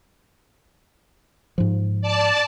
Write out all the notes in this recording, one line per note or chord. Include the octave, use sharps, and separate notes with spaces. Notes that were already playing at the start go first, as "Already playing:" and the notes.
G#2 F3
D5 A5